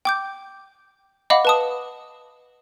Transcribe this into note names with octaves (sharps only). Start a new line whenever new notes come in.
G5 D6 G6
D#5 F5 F#5 B5 D6
B4 A5 D#6